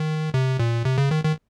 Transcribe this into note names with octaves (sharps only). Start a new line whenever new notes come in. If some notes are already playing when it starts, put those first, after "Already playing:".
Already playing: D#3
C3
A#2
C3
C#3
D#3
D#3